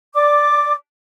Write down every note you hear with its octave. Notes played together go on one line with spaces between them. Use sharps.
D5 D6